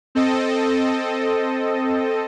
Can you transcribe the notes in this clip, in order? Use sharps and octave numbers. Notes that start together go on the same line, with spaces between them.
C4 A4 D#5